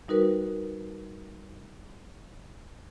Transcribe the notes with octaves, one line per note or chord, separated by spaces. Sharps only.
G3 D#4 F#4 A#4 B4